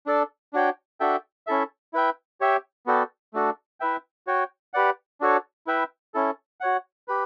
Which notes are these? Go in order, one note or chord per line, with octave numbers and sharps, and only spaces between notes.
D4 A4 D5
D4 F#4 C#5 G5
D4 F#4 A4 E5 G5
C#4 E4 A4 E5
E4 B4 E5 G5
G4 C#5 E5 G5
B3 F#4 A4 D5 G5
A3 D4 F#4 A4
E4 B4 E5 G5
F#4 C#5 G5
G4 B4 D5 F#5
D4 F#4 A4 C#5
E4 B4 E5 G5
C#4 E4 A4
F#4 C#5 F#5
G4 B4